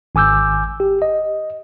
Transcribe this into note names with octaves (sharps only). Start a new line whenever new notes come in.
G#1 G#5 D6 E6 G6
G4
D#5